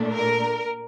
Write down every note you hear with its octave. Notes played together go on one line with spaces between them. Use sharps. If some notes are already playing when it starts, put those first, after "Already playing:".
Already playing: A#2 A3 D4
A#4